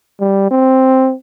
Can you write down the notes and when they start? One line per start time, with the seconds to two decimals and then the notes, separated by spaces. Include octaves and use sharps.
0.20 G3
0.51 C4